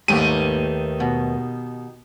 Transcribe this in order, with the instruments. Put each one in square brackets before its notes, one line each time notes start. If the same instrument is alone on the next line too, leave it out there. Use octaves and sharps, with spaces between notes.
[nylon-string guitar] D#2 A3 B4 [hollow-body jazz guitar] G#2 A#3 [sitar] D#3 G4 [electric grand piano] D#7
[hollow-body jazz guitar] B2